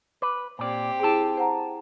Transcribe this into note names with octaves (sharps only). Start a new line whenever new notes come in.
B4 D6
A#2 C4 G4 D5
E4 G#4 G5 A5
C5 F#5 A#5